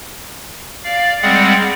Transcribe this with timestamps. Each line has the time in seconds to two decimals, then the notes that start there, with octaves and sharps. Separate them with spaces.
0.84 D5 F5
1.22 G3 G#3 C4 G#4 D5 F#5